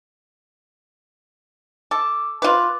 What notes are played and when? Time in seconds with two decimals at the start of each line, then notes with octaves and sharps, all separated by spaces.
1.91 A4 D6
2.42 F4 B4 D6 A6